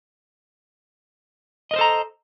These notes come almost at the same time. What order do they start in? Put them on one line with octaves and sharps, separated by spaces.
D#5 A#4 C5 A4 A#5